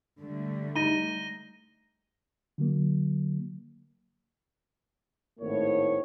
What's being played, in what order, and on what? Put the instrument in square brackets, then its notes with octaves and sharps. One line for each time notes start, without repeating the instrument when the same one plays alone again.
[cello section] D3 G3 A3
[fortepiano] D#4 [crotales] A#6 D#7 G7
[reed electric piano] D3 F#3 A#3
[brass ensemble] G#1 A2 A#3 C#5